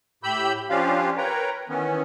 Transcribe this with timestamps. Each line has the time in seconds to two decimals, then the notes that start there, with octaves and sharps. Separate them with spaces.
0.23 A2 G4 B5 E6 G6
0.70 F3 C#4 D4 F4 G4 F5
1.17 A#4 B4 C#5 G5 A#5
1.68 D#3 E3 B3 C#4